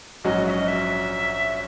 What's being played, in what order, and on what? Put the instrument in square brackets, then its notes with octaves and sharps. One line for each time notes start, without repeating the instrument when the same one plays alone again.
[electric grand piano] A#1 G#2 F#3 C#4 F#4 [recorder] D#5
[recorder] E5
D#5
E5